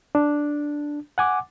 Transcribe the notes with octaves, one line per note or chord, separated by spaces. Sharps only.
D4
F#5 G#5 D6